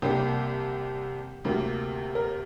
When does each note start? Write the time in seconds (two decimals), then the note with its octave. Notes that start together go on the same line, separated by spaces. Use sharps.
0.02 C2 C3 G3 A#3 G4
1.45 D2 C3 A#3
2.15 A#4